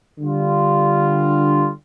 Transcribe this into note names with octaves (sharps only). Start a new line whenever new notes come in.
D3 G3 F4